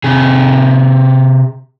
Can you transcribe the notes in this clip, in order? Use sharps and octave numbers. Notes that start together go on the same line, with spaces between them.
C3 G#4